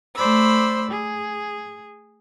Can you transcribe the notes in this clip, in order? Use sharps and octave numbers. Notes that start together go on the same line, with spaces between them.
A3 C5 D5 B5 E6
G#4